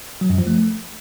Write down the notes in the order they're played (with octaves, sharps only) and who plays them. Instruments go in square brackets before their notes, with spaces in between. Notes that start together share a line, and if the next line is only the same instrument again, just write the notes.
[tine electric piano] F#3
F#2
F3
A3